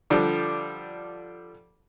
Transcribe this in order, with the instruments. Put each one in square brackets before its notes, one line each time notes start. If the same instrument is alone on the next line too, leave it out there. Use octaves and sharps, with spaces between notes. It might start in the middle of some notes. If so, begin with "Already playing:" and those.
[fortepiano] D3 F3 G3 D4